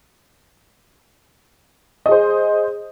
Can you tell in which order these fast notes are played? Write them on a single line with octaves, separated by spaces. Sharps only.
D#5 G#4 C5